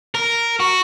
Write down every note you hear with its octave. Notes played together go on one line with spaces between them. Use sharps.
A#4
F#4